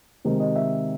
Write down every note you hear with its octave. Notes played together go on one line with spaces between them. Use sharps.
C3 D#3 G#3 C4
D#5
E5